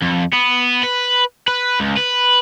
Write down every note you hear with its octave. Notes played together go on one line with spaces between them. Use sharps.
F2
B3
B4
B4
C#2
B4